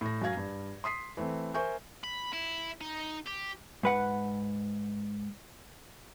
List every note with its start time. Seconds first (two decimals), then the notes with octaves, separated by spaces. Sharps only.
0.01 A2 A#6
0.22 F#2 F#3 F5 G#6 A#6
0.37 G2
0.84 C6 D#6 B6 C7
1.17 E3 A3 C4
1.54 A#4 C5 E5 G#5 C#6 G6
2.04 B5
2.33 E4
2.81 D#4
3.27 G4
3.83 G#2 B4 F#5